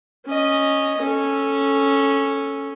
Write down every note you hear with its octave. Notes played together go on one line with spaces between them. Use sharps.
C#4 D#5
C#4 A4